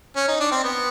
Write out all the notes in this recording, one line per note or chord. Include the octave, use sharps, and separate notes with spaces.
C#4
D#4
D4
C4
B3